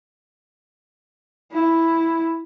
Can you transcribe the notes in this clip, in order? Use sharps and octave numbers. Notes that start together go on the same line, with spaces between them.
E4